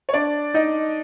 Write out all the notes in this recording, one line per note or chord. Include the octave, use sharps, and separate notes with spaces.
C#5
D4 D5
D#4 D#5